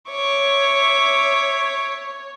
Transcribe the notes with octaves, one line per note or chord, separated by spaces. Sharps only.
C#5 E5 C#6 D6